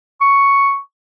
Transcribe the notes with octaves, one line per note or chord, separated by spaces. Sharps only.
C#6